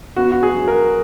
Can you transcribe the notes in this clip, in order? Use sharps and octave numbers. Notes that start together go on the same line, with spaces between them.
B3 F#4
F#4
G#4
F#3
A#4